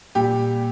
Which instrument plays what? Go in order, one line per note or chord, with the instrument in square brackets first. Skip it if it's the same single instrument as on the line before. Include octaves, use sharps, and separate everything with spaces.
[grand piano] A#2 G3 G4